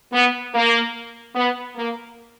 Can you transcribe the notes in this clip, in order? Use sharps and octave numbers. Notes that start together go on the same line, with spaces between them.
B3
A#3
B3
A#3